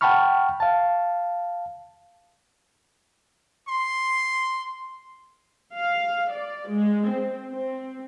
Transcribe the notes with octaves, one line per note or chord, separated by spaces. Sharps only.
F#5 G5 A5 B5 C#6 F6
F5 A5
C6
F5
D5
G#3
C4
C4